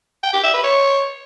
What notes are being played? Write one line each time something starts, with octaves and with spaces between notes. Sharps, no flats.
G5
G4
E5
B4
C#5